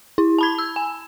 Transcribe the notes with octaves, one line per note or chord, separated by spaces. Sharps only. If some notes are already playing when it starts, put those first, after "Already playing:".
E4
A5 B5 G#6
E6
G#5